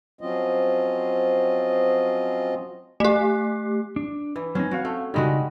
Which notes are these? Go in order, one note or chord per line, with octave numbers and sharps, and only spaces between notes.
F3 F#3 C4 C#4 F4 D#5
A3 G4
D4
E3
F#3 C4 C#4 D#4
C4 F#4 C#5 F5
A3
C#3 G3 G#3 D#4 E4 F#4